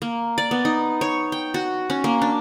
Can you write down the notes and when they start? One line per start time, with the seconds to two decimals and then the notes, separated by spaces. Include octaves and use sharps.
0.02 A#3
0.38 D5
0.51 B3
0.65 D#4
1.01 C#5
1.32 G5
1.54 F#4
1.90 C#4
2.04 A#3
2.22 D4